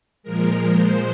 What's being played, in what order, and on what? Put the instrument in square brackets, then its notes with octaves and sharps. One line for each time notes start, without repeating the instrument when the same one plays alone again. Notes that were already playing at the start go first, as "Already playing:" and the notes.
[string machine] A#2 F3 G#3 A#4
C5